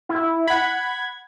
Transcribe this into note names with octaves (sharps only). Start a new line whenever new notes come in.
E4
F#5 B5 G#6